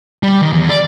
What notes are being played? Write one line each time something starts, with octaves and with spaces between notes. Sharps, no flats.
G3
D#3
E2
D5